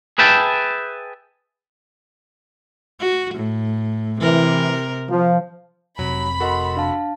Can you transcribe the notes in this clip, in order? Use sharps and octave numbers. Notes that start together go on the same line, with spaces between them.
G#4 B4 E5 G5 A5
F#4
A2
C3 E3 A#4
F3
F1 C3 F#3 B5
F#4 A4 A#4 D#5 F#5 C6
D4 F5 A5